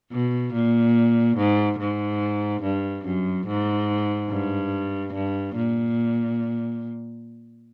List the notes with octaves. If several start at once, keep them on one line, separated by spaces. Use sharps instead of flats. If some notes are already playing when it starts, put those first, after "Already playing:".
B2
A#2
G#2
G#2
G2
F#2
G#2
G2
G2
A#2